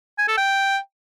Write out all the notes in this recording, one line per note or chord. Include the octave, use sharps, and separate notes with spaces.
G#5
A4
G5